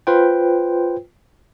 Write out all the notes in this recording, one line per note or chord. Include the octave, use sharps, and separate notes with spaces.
F4 B4 C5 G5